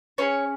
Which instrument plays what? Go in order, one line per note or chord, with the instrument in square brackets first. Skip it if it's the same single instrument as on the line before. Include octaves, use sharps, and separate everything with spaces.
[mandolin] C#4 E4 G#4 C#5